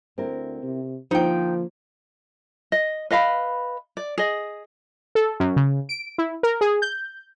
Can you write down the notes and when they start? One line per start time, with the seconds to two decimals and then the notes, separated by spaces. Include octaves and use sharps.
0.18 D2 C4 E4 A#4
0.63 C3
1.11 D3 F3 A#3 D#4 C5 G5
2.72 D#5
3.11 B4 D#5 F5 B5
3.97 D5
4.18 G#4 D#5
5.15 A4
5.40 F#2
5.56 C#3
5.89 D7
6.18 E4
6.43 A#4
6.61 G#4
6.82 G6